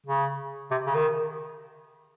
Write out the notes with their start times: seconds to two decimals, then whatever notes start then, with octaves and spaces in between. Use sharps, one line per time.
0.07 C#3
0.71 C3
0.87 C#3
0.95 D#3